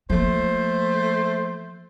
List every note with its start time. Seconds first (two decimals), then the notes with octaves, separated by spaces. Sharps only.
0.10 F3 A3 A#3 C5